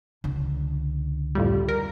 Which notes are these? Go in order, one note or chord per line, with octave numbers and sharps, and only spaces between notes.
C#2 D3
F2 A2 G3
A#4